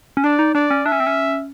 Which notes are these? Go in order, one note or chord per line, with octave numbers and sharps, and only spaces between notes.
C#4
D4 D5
D#4
D4 D5
C#4
D4 E5
C#4
C4
C#4